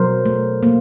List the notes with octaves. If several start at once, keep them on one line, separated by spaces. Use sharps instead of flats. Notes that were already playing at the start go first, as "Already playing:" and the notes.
Already playing: B2 F#3 A#4 C5
A3
A#3